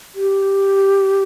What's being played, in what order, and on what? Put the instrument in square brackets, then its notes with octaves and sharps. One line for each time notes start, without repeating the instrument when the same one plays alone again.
[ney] G4